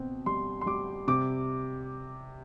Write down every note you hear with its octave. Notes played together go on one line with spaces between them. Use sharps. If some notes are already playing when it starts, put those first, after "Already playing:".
Already playing: B2 C4
G3 C6
C6
G3 D6
C3 D6